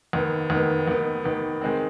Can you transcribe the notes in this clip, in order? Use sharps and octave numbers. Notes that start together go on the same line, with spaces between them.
D#2 D#3 B3
D#2 D#3 B3
D#2 D#3 B3
D#2 D#3 B3
D#3 G#3 C4